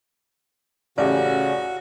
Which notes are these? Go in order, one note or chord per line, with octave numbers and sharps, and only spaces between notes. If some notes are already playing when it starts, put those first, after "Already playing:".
A1 C#3 F#4 G4 D5